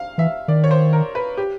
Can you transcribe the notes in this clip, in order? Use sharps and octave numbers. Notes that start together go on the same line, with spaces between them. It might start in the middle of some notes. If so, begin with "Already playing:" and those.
Already playing: F5
E3 E5
D#3 D5
C#5
C5
A#4
B4
G4